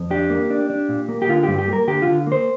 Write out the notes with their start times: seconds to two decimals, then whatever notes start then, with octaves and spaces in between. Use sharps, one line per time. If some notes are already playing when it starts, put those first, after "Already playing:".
Already playing: F2
0.10 D4 G4
0.30 A#3
0.50 D4
0.70 D4
0.89 A#2
1.09 A#3
1.22 G4
1.29 D3 F4
1.43 G2 G4
1.58 G4
1.67 A#3
1.73 A#4
1.88 D3 G4
2.02 D3 F4
2.27 A#3 C5